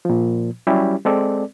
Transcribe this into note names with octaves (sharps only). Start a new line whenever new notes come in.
A#2 F3
F#3 G3 C#4 E4 G4
G#3 C4 A4 D5